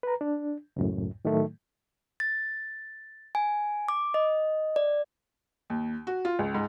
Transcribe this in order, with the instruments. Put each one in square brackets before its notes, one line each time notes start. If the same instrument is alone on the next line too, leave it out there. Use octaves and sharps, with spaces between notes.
[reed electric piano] B4 A#5
D4
C#2 F#2 A2
A2 D#3 F#3 A3
[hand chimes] A6
G#5
D6
D#5
D5
[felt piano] D#2
F#4
F4
C#2
G#2